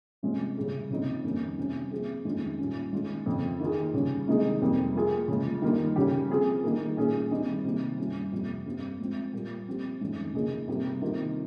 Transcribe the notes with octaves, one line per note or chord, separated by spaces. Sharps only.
C3 F3 G#3 C#4
C#3 G3 C#4 G#4
C#3 F3 C4 D#4
F2 D#3 G3 A#3 C#4
C3 G3 C#4
F3 C4 F4 G#4
F2 D#3 G#3 C#4 F4
A#2 G3 C#4
D#3 G#3 C#4 F4
F2 C#3 F3 C4
D#3 A#3 F4 G#4
C#3 G3 C#4
C3 D#3 G#3 D#4 G#4
F2 C3 G3 A#3
F3 A#3 F4 G#4
C#3 F3 G#3
D#3 G3 A#3 F4
C#3 G3 C#4 G4
F3 C4 F4 G#4
D#3 G3 A#3
A#2 G3 C#4 G#4
D#3 G3 C4 D#4
C3 D#3 G3
G2 G3 C#4 F4
F2 C3 G3
G2 G3 C4
G#2 F3 C4
A#2 G3 A#3
F3 C4 G4
F2 D#3 G#3 C#4
C#3 F3 A#3 D#4 G#4
C3 G3 A#3
C3 D#3 G3 A#3 F4